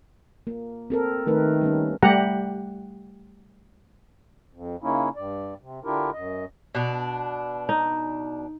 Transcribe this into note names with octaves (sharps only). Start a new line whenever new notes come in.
A#3
C4 A4 A#4
D#3 A3 A#4 B4
G3 A#3 C#4
G3 A3 G4 F#5 A#5
F2
C#3 A#3 C#4 D#4 E4
G2 D5
C3
D3 D4 E4 F4 G4 A#4
F#2 D#5
B2 D4
D#4